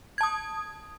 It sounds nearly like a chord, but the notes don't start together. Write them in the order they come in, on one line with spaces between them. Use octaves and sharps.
G#6 A5 D#6